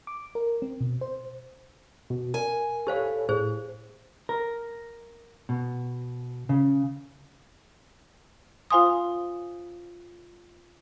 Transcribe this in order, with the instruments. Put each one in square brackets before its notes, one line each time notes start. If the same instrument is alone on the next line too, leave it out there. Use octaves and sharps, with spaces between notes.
[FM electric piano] D6
A#4
C4
B2
C5
[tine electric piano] B2
[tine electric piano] A#4 [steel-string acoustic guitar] G#5
[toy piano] G4 C5 F5 [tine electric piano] A4 C#5
[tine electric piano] A2 [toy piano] G#4 C5
[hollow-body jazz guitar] A#4
B2
C#3
[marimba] F4 C5 F5 G#5 C6 D#6